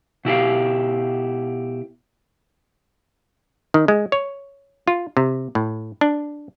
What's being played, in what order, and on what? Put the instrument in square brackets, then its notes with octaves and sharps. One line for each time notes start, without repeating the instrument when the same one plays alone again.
[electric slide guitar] B2 E4 G4 F5
[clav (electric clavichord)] D#3
G#3
C#5
F4
C3
A2
D4